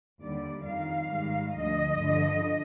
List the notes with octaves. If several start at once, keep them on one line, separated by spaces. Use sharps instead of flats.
D#2 D3 G3 D5
F2 D#3 G3 F5
G#2 D#3 G3
D2 D3 F3 D#5
G2 D3 F3